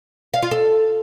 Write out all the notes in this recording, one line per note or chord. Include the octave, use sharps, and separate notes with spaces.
F5
F4
A4